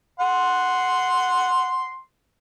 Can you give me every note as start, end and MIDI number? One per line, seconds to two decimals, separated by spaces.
0.20 1.97 78
0.20 1.97 84